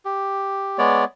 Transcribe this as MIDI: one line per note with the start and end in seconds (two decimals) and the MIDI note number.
0.05 0.77 67
0.78 1.04 56
0.78 1.04 59
0.78 1.04 73
0.78 1.04 74